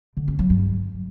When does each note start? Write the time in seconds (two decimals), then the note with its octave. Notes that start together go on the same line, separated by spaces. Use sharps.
0.17 D3
0.28 C#4
0.39 F#3
0.50 G2